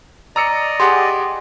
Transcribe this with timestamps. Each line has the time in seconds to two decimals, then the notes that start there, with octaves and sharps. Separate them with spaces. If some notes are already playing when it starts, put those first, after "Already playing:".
0.36 D5 D#5 A#5 E6 C#7
0.80 G4 G#4 F#5 C6